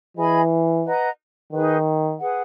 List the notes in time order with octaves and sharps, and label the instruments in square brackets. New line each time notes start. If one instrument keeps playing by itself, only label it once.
[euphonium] E3 [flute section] G#4 D#5 G#5 B5
[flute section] B4 D#5 F#5 A#5
[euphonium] D#3 [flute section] D#4 G#4 B4
[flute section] G#4 B4 F#5